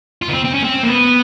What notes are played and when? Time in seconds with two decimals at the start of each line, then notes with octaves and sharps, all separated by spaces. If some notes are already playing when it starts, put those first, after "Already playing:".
0.22 F4
0.29 B3
0.33 C4
0.45 C4
0.54 C#4
0.63 C4
0.83 A#3
0.88 B3